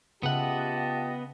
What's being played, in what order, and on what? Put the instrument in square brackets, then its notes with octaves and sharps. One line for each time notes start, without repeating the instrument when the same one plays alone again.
[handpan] C#3 E5 [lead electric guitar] B3 F#5 [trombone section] F4 G4 [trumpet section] D#5 A5